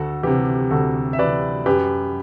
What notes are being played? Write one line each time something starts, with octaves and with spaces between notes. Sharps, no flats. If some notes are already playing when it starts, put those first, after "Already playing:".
Already playing: D2 F#4 A4
C3 E3 G4
D2 F#4 A4
E5
C3 E3 B4 D5
F#2 G4 B4